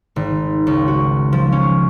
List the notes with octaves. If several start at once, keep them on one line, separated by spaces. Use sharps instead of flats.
G#1
C#2
F#4
F3
C#4